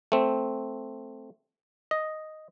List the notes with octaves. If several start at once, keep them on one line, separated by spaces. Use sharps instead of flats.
A3 C4
D#5